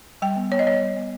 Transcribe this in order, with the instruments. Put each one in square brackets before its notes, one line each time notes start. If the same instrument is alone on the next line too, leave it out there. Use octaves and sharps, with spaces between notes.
[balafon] G3 G5
B3
B3 C#5
D#5
G3 C#5
G3
B3